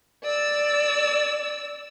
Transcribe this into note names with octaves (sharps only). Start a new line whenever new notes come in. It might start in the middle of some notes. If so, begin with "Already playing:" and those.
D5 E6